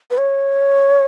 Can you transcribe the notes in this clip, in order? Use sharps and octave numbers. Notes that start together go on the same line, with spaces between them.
B4
C#5